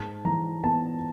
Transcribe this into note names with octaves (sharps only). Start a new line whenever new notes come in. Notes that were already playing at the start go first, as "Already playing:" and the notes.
Already playing: G#2 A5
E3 A#5
B3 A5